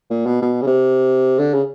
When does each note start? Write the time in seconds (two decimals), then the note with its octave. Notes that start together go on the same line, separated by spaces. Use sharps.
0.10 A#2
0.26 B2
0.42 B2
0.62 C#3
0.66 C3
1.39 D3
1.53 C#3